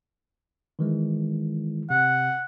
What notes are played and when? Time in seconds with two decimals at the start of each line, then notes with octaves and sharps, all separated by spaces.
0.79 D#3 E3 G#3
1.90 C3 F#5